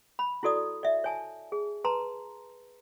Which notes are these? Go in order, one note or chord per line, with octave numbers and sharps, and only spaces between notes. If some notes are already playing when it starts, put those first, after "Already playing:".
B5
E4 F#4 A4 D5 D#6
D5 E5
C#5 G#5 A5
G#4
B4 A5 A#5 C6